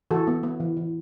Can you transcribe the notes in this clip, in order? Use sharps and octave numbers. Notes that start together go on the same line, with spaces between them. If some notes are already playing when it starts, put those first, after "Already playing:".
E3 F#4 A4
B3
B3
E3
E3